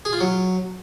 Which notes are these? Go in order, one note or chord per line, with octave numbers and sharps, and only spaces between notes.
G#4
F4
F#3